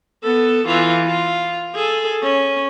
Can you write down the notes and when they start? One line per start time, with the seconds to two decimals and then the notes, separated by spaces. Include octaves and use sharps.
0.24 B3 A4
0.67 E3 F4
1.07 F4
1.75 G#4 A4
2.23 C#4